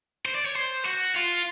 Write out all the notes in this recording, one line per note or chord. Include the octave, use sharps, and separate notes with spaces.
C5
D5
C#5
C5
F#4
F4